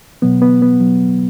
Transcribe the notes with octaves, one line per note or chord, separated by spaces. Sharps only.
B2 F#3 B3
B3
B3
F#3